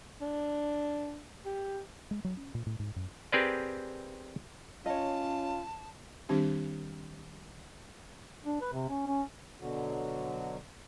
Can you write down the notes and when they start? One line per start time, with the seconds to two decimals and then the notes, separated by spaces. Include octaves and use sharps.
0.21 D4
1.45 G4
2.11 G#3
2.24 F#3
2.37 C#4
2.55 A#2
2.66 A2
2.80 G#2
2.96 F#2
3.32 C4 G4 G#4 A#4 B4 D5
4.86 C#4 F4 C#5 D#5 A5
6.29 D#3 G3 C4 D4 G4
8.45 D4
8.61 B4
8.73 C3
8.89 C#4
9.07 C#4
9.59 B2 D3 F#3